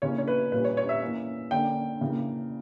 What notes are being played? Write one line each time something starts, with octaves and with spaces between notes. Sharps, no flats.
C#3 E3 A#3 C#4 C#5
C#5
B4
A#2 G3 C#4 B4
C#5
C#5
E5
E3 A#3 C#4
D3 A#3 C#4 G5
C#3 E3 A#3